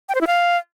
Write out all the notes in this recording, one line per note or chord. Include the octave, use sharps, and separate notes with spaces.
G5
C5
E4
F5